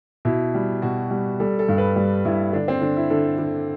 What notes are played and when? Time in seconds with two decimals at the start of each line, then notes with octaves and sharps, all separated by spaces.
0.25 B2 E4
0.54 G3
0.82 B2 F#4
1.10 G3
1.40 G3 A4
1.59 A4
1.69 G2
1.78 B4
1.96 G3
2.25 G2 E4
2.53 D3 D4
2.68 C4
2.81 D3 D4
2.97 E4
3.10 D3 A4
3.38 D3